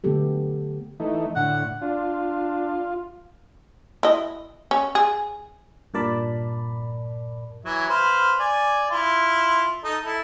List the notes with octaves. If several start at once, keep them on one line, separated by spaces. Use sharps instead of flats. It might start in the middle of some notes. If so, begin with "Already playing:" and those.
D3 F#3 A3 B3 G4 A4
E3 A3 D#4
A2 D3 F#5
D4 F4
E4 D#5
C#4
G#4
G2 A#2 A#4 D5 A5 B5
E3 F#3 E5
B4 C5 F5
D5 G#5
E4 F4
D#4 A4
E4 A4